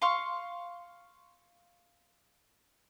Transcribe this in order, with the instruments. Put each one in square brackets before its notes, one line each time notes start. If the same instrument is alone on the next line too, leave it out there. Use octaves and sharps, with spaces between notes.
[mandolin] F5 C6 C#6 F6